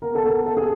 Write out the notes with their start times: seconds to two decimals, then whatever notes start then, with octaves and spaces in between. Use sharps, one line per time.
0.02 B3 A#4
0.15 A4
0.23 B3 A#4
0.46 B3 A4
0.57 G#4